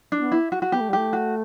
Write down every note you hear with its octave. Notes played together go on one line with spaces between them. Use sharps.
D4
B3
E4
F#4
F#4
B3 G4
A3
G3
A3 G4
F#4